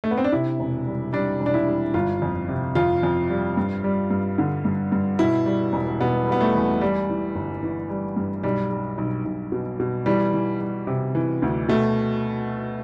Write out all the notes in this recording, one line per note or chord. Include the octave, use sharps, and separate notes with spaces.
A3
B3
C4
D4
C3 E4
E1
G3
G3 D4
E1
D4
E4
G3
G1 F4
F2
C3
F2 F4
F2
G3
G2
G3
G2
D3
G2
G2
B2 E4
G3
E1
B2 B3
G3 B3
A3
E2
G3
E3
G1
E3
G3
G2
B1 G3
G3
B1
B1
B2
B2
E3 G3
E3
G3
C3
E3
D2
B2 A3